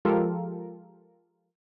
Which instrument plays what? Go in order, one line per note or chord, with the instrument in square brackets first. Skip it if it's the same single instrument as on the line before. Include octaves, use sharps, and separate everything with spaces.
[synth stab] F3 G#3 F4 G4 A4 A#4